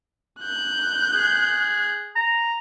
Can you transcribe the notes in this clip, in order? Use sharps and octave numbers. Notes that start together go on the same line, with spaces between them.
F#6 G6
G#4
A#5